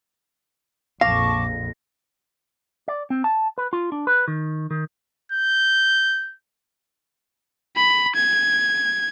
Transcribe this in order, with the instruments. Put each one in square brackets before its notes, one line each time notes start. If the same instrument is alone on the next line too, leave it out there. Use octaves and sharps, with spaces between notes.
[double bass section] A#1 F2 [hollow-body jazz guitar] F5 [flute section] A5 C#6 D6 [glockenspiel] A#6
[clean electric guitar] D5
C4
A5
B4
F4
D4
B4
D#3
D#3
[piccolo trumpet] G6
[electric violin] B5
G#6